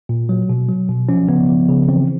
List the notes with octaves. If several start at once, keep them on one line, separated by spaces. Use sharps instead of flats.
A#2
F#3
B2
F#3
B2
F3 C#4
C#3 B3
F3
C#3
E3 C4